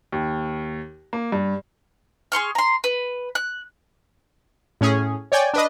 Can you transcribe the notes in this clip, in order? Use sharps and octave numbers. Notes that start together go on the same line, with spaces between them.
D#2
A#3
G2
G#4 C6 C#6 F6
A#5 C6
B4
F#6
A2 C#4 G#4
C#5 D5 G5 G#5
D4 B4 D#5